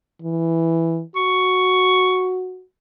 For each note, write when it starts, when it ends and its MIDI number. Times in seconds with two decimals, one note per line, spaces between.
0.22 1.02 52
1.16 2.63 66
1.16 2.34 85